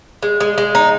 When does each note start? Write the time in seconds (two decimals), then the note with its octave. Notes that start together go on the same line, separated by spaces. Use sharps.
0.23 G#3
0.40 G#3
0.58 G#3
0.75 D#4